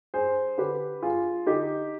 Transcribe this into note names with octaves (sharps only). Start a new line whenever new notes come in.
G2 G#4 C5
D3 G4 B4
G2 F4 G#4
D3 D#4 G4